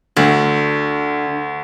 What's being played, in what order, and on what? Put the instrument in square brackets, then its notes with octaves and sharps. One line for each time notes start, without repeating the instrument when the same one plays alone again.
[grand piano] D2 [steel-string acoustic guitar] D3